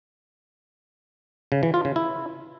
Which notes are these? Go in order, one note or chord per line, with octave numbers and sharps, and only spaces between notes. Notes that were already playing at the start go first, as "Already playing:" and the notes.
C#3
E3
F4
C#3
E4